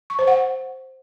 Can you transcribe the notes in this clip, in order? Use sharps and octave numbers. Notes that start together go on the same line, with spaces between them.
C#6
C5
F#5